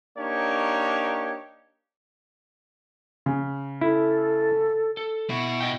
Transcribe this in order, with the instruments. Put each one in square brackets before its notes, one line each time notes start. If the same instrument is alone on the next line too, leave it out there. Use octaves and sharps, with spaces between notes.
[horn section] A#3 D4 D#4 G4 C#5
[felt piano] C#3
[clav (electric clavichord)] E4 [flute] A4
[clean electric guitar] A4
[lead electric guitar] B2 F#4 [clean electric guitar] E4
[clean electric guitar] E4 D#5 G5